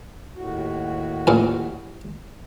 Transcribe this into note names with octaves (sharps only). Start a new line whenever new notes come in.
D#2 A2 F#4
A1 A#2 G#5